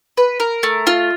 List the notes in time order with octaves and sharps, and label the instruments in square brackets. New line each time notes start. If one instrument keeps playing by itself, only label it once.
[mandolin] B4
A#4
A3
F4